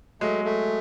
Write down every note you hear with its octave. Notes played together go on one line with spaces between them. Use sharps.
F#3 G#3 A3
A3